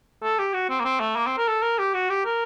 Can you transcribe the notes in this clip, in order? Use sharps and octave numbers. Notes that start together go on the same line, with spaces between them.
A4
G4
F#4
C4
A#3
C4
A3
A#3
C4
A#4
A4
A#4
G4
F#4
G4
A#4